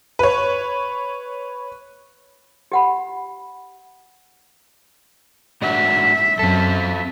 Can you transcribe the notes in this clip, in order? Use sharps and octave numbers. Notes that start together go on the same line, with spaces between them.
B4 C#5
G4 F#5 B5
G#2 D4 F#4 E5
F#2 C4 A4